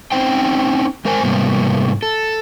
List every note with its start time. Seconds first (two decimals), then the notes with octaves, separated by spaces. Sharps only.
0.12 C4 C#4 D#4 C5 G5
1.05 G#3 A#4 C5 G#5
1.23 G#2 C3 G3 A#3 B3
2.03 A4